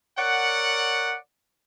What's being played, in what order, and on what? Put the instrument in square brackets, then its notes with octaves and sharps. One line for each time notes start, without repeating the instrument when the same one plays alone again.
[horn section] A#4 C#5 D5 F#5